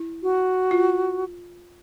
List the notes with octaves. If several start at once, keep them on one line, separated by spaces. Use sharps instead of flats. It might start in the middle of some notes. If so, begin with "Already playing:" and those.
Already playing: E4
F#4
F4